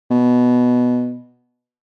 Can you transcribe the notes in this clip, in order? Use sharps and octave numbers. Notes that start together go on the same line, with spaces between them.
B2